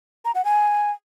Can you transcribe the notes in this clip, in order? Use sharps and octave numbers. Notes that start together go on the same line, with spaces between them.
A#5
F#5
G#5